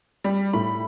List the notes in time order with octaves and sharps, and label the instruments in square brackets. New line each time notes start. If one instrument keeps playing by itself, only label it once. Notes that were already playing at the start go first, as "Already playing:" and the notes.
[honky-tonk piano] G3
[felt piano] A2 [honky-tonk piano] B5